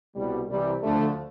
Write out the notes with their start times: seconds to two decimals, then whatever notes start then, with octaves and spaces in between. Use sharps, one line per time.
0.15 C2 B2 G3
0.49 C2 C3 E3 G3
0.83 D2 D3 F3 A3